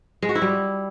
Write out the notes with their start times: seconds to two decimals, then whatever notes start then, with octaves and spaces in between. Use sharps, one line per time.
0.22 G#3
0.29 F#4
0.35 E4
0.42 G3